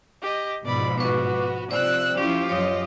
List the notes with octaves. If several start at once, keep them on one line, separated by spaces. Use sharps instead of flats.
G4 D#5
G#2 B2 F3 D5 B5
B3 F#4 B4 C#6 D6
C3 F3 C5 D5 E6 F#6
F3 C#4 E4 F4 G4
F#2 C#5 D#5